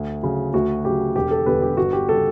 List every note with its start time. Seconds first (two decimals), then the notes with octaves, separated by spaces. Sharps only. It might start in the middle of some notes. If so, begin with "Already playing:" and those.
Already playing: D2
0.23 C#3 F#3
0.54 D2 F#4
0.85 C#3 F#3 G4
1.16 E1 G4
1.31 A4
1.46 E2 D3 G3 B4
1.62 G4
1.77 G1 F#4
1.93 G4
2.09 C#3 G3 A4